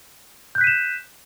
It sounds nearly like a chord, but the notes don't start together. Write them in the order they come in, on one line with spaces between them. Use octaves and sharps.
G6 F#6 B6 D#7 E7